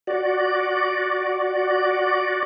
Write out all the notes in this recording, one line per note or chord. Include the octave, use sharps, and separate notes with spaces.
F#4 D5